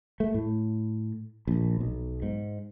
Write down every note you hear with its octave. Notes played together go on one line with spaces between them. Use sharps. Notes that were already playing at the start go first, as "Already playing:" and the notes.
A3
A2
A#1
B1
G#2